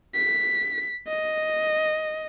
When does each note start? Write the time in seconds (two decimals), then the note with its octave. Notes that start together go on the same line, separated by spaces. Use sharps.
0.15 B6
1.08 D#5